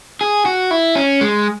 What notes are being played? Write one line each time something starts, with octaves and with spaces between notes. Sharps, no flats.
G#4
F#4
E4
C#4
G#3